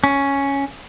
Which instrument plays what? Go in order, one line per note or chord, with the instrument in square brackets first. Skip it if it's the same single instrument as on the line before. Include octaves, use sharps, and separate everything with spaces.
[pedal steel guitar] C#4